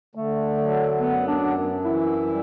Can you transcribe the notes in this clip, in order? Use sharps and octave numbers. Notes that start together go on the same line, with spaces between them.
D3 A3
F#3
F#2 B3
D4
F#2
E3 E4
G3